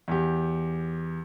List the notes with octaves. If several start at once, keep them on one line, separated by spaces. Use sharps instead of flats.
E2 G4